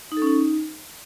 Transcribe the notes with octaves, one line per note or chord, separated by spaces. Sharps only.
D#4
A4
C#4
D#4